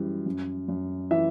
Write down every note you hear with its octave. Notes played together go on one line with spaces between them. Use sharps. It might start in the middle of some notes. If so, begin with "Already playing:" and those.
Already playing: F#2 E3 G3
F#2
F#2
E3 E5